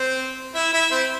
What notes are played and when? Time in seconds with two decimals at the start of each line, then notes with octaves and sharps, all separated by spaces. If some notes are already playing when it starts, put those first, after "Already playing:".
Already playing: C4 C5
0.55 E4 E5
0.73 E4 E5
0.91 C4 C5